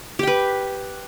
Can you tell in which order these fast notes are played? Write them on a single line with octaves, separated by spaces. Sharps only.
G4 G5 B4